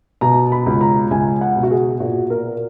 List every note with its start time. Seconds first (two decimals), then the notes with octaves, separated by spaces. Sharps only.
0.21 B2 A#5
0.52 B5
0.66 C#2
0.81 A#5
1.10 C#2 G#5
1.41 F#5
1.56 B2
1.63 F#4
1.71 G#4
2.00 A#2 F#4
2.30 A#4